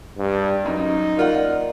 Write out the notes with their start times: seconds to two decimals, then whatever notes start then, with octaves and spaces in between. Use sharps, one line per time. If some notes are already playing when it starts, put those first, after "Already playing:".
0.18 G2
0.66 F#2 D#4
1.17 A#3 F4 A#4 D5 F5 F#5